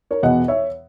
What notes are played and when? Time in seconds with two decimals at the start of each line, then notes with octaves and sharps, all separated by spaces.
0.11 A#4 C#5
0.23 E2 B2 D#5 F#5
0.48 C#5 E5